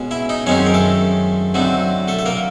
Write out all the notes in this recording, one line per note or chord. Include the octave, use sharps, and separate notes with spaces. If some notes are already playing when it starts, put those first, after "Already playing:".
Already playing: B2 G#3 C#4
E4 E5
D#4 D#5
F#2 D#3 G#3 C4 C#4 D#4 C#5
A#4
A3 A4
D3 F#3 A3 C4 D#4
A3 A4
A4
A#3 A#4